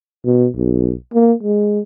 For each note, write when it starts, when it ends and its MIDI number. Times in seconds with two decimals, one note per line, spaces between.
0.25 0.47 47
0.55 0.93 35
1.14 1.33 58
1.43 1.80 56